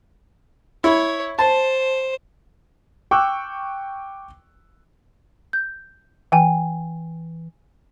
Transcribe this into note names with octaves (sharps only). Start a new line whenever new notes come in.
E4 C#5
C5 A5
G5 C#6 D6 E6 F#6
G6
E3 G5 G#5